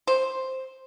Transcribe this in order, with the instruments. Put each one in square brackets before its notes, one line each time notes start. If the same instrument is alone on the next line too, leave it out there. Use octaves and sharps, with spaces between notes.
[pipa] C5